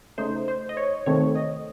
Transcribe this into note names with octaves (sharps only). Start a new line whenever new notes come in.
C#3 A3 D#4 C5
C5
D#5
C#5
C3 D#3 A3 C4 C#5
D#5